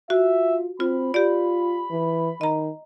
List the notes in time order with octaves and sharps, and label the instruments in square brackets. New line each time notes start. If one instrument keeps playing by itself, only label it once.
[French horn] F4 [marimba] F#4 [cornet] E5
[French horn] C4 [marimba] F4 [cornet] B5
[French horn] F4 [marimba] G4 D5
[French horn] E3
[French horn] D#3 [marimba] D#5 A#5